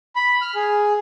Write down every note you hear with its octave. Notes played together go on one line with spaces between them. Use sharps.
B5
F6
G#4